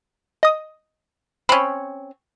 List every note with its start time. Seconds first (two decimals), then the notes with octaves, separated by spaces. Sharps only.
0.43 D#5 D#6
1.49 C4 C#4 B5